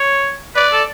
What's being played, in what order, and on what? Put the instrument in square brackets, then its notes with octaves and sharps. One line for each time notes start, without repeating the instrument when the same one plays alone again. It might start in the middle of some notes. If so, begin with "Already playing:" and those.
Already playing: [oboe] C#5
[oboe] B4 [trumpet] D5
[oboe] A4